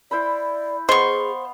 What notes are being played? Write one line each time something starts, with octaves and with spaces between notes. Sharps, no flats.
E4 C5 D5 B5
B3 G#4 C5 D#5 F5 C6 C#6